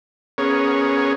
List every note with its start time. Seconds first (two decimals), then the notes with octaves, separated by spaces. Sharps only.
0.38 B3 C#4 G#4 A#4 C#5